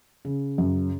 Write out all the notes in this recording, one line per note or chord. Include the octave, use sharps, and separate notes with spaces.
C#3
F#2